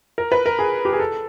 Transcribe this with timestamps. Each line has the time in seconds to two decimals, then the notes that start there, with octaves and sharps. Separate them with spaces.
0.18 A#4
0.32 B4
0.46 A#4
0.59 G#4
0.85 G4
0.93 G#4
1.00 A4